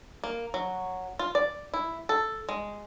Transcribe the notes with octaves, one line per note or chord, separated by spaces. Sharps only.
A#3
F#3
F4
D5
E4
A4
G#3